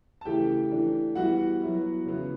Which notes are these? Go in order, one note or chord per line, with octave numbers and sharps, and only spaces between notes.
A5
C#3 E3 A3 E4 G4 G5
E3 A3 D4
E3 G3 B3 E4 F#4 F#5
F#3 B3 E4
C#3 E3 B3 E4